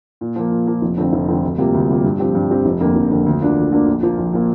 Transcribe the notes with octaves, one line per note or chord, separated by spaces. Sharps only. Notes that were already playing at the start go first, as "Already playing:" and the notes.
A#2
F3 A#3
A#2
F3 A#3
F1
F2 D3 F3 C4
F1
F2 D3 F3 C4
D2
C3 G3 A#3 F4
D2
C3 G3 A#3 F4
G2
F3 C4 G4
G2
F3 C4 G4
F1
F2 D3 A#3
F1
F2 D3 A#3
D2
D3 A#3 D4 F4
D2
D3 A#3 D4 F4
A#1
A#2 F3 A#3 F4
A#1
A#2 F3 A#3 F4